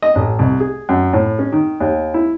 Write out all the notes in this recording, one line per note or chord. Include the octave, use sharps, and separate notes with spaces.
D#5
A1
C2
G#4
F#2
A2
C#4
D#3
D#2
E4